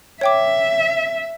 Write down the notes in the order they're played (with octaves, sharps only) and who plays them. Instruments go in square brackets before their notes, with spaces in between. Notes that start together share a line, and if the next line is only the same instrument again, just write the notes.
[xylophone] C#5 G5 D6 [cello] E5